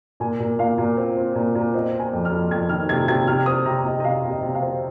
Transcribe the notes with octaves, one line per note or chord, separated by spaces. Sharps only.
A#2 G#5
A#2
A#2 F5
A#2
C4
C4
A#2
A#2
C4 D#5
C4
G#5
F2
F6
F2
F2 G#6
D#3 F6
C3 G#6
C3 G#6
C3 F6
C4 D#6
C3 A#5
C3 D#5
D#5
C3 F5
C3
D#5
C3
F5
C4